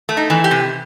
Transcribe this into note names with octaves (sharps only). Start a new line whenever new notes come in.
A3
D#4
E3
G4
C3